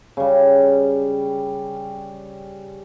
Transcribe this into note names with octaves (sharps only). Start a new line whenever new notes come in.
C#3 G3